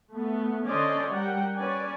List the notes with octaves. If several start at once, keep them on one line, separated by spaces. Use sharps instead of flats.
A3 B3
D3 C#4 C5 D5 D#5 C6
G3 A#4 F#5 G5
C#4 B4 D5 G#5